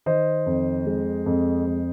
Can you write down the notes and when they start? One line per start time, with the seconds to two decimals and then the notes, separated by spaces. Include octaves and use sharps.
0.06 D#3 C5 D#5
0.46 F2
0.86 G#3
1.26 F2
1.66 F2